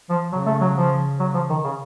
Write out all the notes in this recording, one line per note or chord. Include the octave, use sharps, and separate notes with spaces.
F3
C#3 F#3
A3
F#3
F3
F#3
F3
D#3
C#3